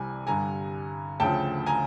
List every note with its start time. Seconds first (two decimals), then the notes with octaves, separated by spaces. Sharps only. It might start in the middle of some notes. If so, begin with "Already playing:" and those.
Already playing: C2 C3 E3 G3 G#5
0.26 G2 D3 G3 G#5 A#5
1.20 D2 C#3 F3 G5 A5
1.66 G#5 A#5